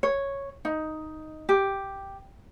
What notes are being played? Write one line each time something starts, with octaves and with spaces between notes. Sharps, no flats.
C#5
D#4
G4